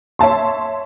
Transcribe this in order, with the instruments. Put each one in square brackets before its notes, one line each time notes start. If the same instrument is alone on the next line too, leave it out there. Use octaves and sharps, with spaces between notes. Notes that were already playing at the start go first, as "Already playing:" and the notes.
[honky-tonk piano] C#5 E5 A5 C6